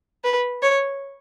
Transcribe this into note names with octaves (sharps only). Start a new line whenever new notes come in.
B4
C#5